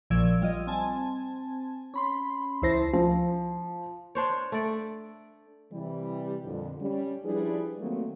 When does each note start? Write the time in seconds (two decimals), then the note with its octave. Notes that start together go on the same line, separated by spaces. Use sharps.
0.10 A#1 A#2 F3 D5 E6 G#6
0.42 G3 F4 D#5
0.67 C4 G#5 A5
1.94 C#4 B5 C6
2.62 C#2 E3 E4 C5 A5 A#6
2.93 F3
4.15 D4 C5 C#5
4.52 A3 D5
5.72 C3 E3 G3
6.44 F2 A#2 D3
6.80 G3 C#4
7.23 F3 G3 D4 E4 G#4 B4
7.79 D#3 F#3 G3 A3 A#3 C4